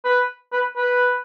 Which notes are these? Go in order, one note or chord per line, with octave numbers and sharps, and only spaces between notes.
B4
B4
B4